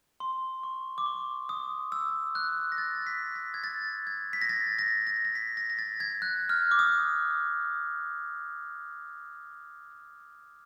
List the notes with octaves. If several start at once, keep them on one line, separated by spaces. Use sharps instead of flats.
C6
C#6
D6
C#6
D#6
E6
F#6
A#6
A6
B6
A6
G#6
A6
G#6
B6
A#6
A6
A#6
A#6
A#6
B6
A#6
A#6
A6
G#6
F#6
F6
D6
D#6